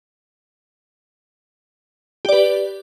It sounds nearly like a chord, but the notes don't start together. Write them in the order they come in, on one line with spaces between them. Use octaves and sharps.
G4 D5 B4